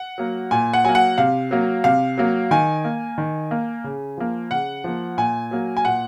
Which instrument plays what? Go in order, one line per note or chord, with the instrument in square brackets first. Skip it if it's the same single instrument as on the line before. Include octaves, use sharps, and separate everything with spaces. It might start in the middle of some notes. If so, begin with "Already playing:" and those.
Already playing: [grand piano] F#5
F#3 A#3
A#2 G#5
F#5
F#3 A#3 G#5
F#5
C3 F5
F#3 A#3
C3 F5
F#3 A#3
D#3 G#5
A#3
D#3
A#3
C#3
F3 A#3
C#3 F#5
F3 A#3
A#2 G#5
F#3 A#3
G#5
A#2 F#5